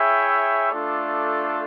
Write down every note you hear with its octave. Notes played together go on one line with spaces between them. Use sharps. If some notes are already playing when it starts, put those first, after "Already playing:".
Already playing: E4 G#4 C#5 E5 G5
A3 D4 F4 A4 D5